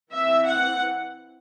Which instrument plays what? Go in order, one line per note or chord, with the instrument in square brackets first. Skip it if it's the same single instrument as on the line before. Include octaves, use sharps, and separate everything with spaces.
[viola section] E3 C4 E5
F#5